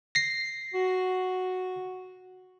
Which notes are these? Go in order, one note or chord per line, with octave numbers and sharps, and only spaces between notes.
A#6 C7
F#4